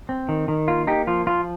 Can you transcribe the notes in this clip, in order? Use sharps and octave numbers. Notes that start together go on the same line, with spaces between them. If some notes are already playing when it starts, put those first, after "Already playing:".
C4
D#3
D#3
A#3 F4
A#3 D#4 G4
F3 F4
F3 F4